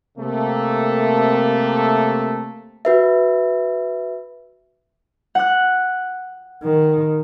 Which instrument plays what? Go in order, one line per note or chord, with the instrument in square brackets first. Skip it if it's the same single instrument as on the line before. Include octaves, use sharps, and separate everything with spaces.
[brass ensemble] C3 A3 A#3
[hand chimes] F#4 B4 E5
[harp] F#5 F#6
[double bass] D#3